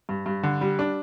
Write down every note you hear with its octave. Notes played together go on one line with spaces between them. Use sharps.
G2
G2
D3
G3
D4